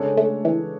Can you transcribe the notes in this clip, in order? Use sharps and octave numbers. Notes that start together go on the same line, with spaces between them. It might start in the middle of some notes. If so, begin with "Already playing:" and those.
Already playing: C#3 G#3 A3 D4 A4 C#5
A3
E3